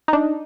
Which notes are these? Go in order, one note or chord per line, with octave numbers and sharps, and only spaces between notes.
D#4
D4